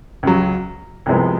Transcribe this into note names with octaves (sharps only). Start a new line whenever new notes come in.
C#2 C#3 F#3
C2 C3 F3 G#3 B3